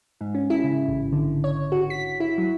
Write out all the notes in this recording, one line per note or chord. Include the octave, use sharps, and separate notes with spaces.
G#2
C#4
E4
C#3
A1
D3
C#5
F#4
B6
E4
F#3